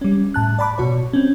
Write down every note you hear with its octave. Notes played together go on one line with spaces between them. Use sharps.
G3 C#4
A2 A5 F#6
D5 A5 B5 D6
B2 F#4 C#5
C4 C#4